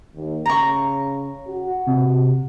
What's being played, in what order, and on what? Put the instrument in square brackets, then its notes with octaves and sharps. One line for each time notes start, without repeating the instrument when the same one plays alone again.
[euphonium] D#2
[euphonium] C#3 [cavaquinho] A#5 C#6
[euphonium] F#4
[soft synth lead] C3